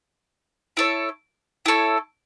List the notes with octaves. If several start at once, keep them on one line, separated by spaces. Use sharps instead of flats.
E4 A4 C#5
E4 A4 C#5